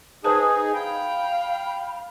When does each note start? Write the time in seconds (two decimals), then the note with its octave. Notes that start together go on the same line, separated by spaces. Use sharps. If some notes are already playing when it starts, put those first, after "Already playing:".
0.24 D#4 G#4 B4 C5 A5 D#6
0.74 F5 G5 B5